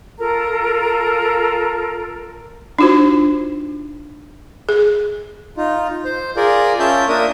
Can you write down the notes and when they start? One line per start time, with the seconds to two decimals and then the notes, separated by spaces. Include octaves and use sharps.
0.19 F4 A4 A#4 A#5
2.79 D4 D#4 F4 F#4 C5
4.69 G#4
5.57 D#4 F4
6.05 C5
6.36 F4 G#4 A#4 D5
6.79 C#4 F4 E5 A5 G6
7.09 A#3 D4 A#4 E5 D#6